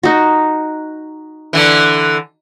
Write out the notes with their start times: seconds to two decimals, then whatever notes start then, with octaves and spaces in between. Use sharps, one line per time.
0.03 D#4 F#4
1.53 D3 E3